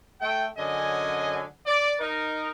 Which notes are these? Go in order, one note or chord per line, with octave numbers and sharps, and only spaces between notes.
A3 G5
F#2 D3 C#4 G#4 D#5 G#5
D5
D#4 A#4